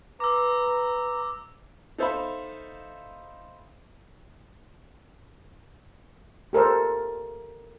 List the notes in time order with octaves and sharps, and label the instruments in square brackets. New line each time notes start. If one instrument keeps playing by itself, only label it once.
[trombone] B4 [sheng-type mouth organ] A#5 [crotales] D6 E6
[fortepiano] D#4 A4 C5 E5 F5 B5
[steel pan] G4 A4 A#4 C5